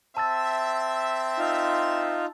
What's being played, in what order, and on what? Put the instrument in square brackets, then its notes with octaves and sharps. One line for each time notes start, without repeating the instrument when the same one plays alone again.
[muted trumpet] C4 [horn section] E5 [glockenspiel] A5 E6 A6
[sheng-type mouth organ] D#4 F4